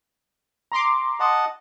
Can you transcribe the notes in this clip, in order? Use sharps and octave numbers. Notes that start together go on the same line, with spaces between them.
A#5 C6 D6
D#5 F#5 A5